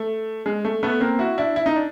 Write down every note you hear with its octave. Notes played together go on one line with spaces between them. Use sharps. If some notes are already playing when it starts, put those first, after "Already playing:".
Already playing: A3
G#3
A3
A3 B3
A#3 C4
E4 F#4
D4 E4
E4
D#4
D4